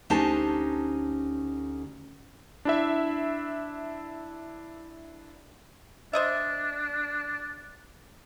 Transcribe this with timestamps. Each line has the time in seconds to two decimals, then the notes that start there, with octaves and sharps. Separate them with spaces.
0.10 D2 C#4 D#4 G4 C5 A5
2.65 D4 E4 E5
6.13 D4 C5 D#5 E5